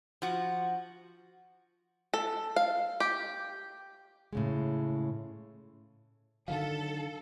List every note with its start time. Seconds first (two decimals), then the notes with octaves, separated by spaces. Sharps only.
0.22 F3 F#4
2.14 A4
2.56 F5
3.00 G4
4.33 A2 C#3 G#3
6.48 D3 D#3 F#3 A4 F5